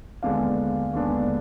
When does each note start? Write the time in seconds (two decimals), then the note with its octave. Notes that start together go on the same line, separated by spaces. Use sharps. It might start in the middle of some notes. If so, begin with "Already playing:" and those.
0.23 D#2 D3 G#3 B3 D4 F5
0.93 D#2 D3 G#3 B3 D4